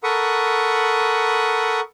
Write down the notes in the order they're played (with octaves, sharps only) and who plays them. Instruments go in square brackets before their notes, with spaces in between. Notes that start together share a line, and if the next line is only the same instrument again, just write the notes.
[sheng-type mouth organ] A4 A#4 F#5 B5 C#6 D#6